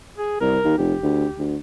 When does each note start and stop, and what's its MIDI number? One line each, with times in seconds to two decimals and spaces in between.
0.18 0.38 68
0.41 0.58 36
0.41 0.75 70
0.64 0.77 39
0.78 0.94 29
0.78 1.44 67
1.02 1.26 38
1.39 1.56 38